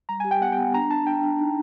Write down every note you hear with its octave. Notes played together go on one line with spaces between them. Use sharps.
G3 A#5
G#5
G4
G5
B3 F#5
G5
B3
D4 A#5
D4 A5
D4 G5
D4
D#4